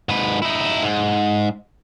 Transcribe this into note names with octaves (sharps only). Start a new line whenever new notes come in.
G#2 B4
D#4 E4
G#2